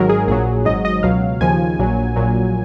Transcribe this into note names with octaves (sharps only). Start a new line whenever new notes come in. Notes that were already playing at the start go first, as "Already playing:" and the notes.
Already playing: G#1 G#2 D#3 F#3 A#4
G#4
A#1 A#2 F#3 G#4
G#1 G#2 F#3 D#5
D#5
C#2 B2 F#3 F5
D#2 C#3 F3 G#5
A#1 A#2 F#3
A#1 A#2 F#3